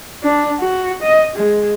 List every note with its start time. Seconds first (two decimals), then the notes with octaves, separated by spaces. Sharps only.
0.23 D4
0.60 F#4
1.03 D#5
1.36 G#3